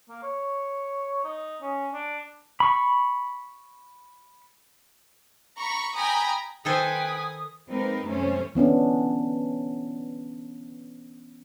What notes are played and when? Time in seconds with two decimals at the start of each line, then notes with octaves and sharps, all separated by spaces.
0.09 A#3
0.23 C#5
1.25 D#4
1.62 C#4
1.93 D4
2.60 B5 C#6
5.58 A#5 B5 C#6
5.95 G5 G#5 A#5 B5 D#6
6.65 D#3 A4 B4 C5 G5 G#5 D#6
7.68 G#3 A#3 C4 D#4 A#4 B4
8.06 F#2 C3 E3 A3 C#4 C5
8.55 E3 B3 C#4 D4